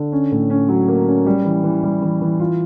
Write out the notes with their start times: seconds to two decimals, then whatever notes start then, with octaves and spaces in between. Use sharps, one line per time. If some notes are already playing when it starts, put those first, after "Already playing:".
Already playing: D3
0.12 C#4
0.31 A2
0.50 C#4
0.69 F#3
0.88 A#3
1.08 C#4
1.26 G3
1.45 E3
1.64 E3
1.83 G3
2.02 E3
2.21 E3
2.40 F4